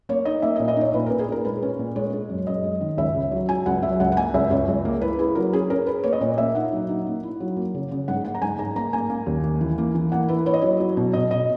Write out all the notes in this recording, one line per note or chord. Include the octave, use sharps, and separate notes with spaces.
A#3 C#5
D#4 D#5
A#3 E5
D#5
A#2
D#5
D#4 C#5
A#2 B4
A#2 A#4
G#4
A#2 A#4
G#3 B4
C#4
A#2
G#3 C#5
G#3
F#2
F#2 D#5
G#3
D#3
C#2 E5
C#3
F#3
F#3 G#5
C#2 F#5
F#3 E5
C#2 F#5
F#5
A#3 G#5
C#2 E5
C#2 C#5
C#2
A#3
E4 B4
E4 G#4
F#3 A#4
C#4 G#4
C#4 A#4
C#4 B4
A#3 C#5
D#5
A#2 C#5
A#3 E5
D#4 F#5
F#3
D#4
A#3
E4
F#3
A#3
C#3
C#3
G#2 F#5
A#3 F#5
A#5
G#2 G#5
G#2 A#5
A#3 A#5
A#3 G#5
A#3
D#2
A#3
E3
A#3
E3
A#3 F#5
E4 B4
E4 C#5
D#5
F#3 C#5
F#3
B2
B2 D#5
B2 D#5